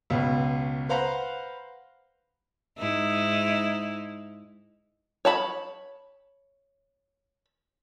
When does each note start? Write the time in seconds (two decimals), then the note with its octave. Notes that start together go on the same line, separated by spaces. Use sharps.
0.10 C#2 B2
0.89 B4 C5 F5 F#5 A#5 B5
2.78 G#2 D#4 E4
5.25 C#5 A5 B5